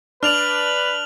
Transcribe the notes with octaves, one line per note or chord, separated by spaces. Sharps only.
D4 B4 D5 F6 F7 F#7